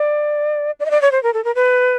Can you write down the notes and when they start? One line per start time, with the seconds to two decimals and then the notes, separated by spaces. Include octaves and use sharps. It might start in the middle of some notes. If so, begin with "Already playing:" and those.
Already playing: D5
0.80 D5
0.86 D#5
0.91 D5
1.02 C#5
1.12 C5
1.23 A#4
1.34 A4
1.45 A#4
1.55 B4